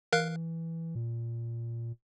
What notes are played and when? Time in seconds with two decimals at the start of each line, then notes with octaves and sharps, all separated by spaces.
0.13 E3 A#4 F5 F#6
0.95 A#2